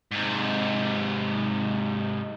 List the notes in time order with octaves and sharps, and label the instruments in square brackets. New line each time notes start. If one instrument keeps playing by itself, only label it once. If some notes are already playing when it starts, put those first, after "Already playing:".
[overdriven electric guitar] G#2 C3